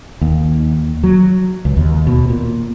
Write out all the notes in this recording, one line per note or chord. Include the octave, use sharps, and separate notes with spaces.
D#2
F#3
C#2
D#2
B2
A#2